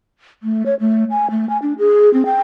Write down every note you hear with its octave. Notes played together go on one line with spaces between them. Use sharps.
A3
C#5
A3
G#5
A3
G#5
D4
G#4
C4
G5